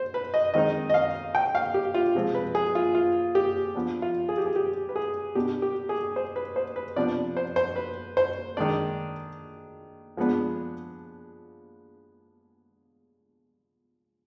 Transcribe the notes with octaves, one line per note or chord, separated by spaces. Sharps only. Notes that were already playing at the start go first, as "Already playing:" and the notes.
Already playing: C5
B4
D#5
D#3 G#3 C4 D#4 D#5
D#5
F5
G5
F5
G4
F4
C3 F3 G#3 C4
B4
G#4
F4
F4
G4
F3 B3 D4
F4
G#4
G4
G#4
G4
B4
G#4
B2 B3 D4 G4
G4
G#4
C5
B4
C5
B4
C3 F3 B3 D4 D5
C5
C5
B4
C5
D#3 G#3 D4 D5
F3 G#3 B3 D4